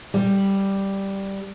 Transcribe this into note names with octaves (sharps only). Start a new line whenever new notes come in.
G3